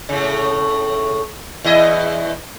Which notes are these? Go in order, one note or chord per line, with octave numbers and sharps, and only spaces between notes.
A2 C#3
E2 E4 D#5